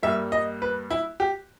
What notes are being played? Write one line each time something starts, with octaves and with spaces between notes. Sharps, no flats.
G2 G3 A#3 E5
D#5
B4
E4
G4